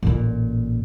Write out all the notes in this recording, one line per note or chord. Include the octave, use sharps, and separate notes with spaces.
A1 A#2